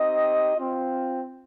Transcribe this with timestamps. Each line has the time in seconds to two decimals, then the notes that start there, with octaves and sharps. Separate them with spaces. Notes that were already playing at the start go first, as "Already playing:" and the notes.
Already playing: C4 D#4 G4 D#5
0.55 C4 F4